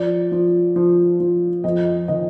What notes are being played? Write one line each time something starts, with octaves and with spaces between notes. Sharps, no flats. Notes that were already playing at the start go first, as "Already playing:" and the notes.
Already playing: F3 D5
F3
F3
F3
F2 D#5
D#3 D#5